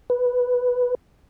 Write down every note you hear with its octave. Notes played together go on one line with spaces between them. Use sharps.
B4